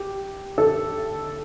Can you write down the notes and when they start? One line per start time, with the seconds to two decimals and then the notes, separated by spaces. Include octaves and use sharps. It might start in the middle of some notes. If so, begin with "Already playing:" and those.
Already playing: G4
0.58 A4